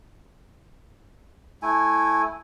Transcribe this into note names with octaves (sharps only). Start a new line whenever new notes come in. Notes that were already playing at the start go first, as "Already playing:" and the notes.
A3 E4 G#5